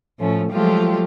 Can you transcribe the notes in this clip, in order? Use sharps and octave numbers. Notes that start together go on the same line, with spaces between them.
A2 F3 A3 C#4
F3 F#3 G#3 A3 F4 G4